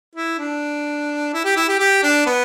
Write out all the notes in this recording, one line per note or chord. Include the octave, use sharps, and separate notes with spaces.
E4
D4
E4
G4
E4
G4
G4
D4
B3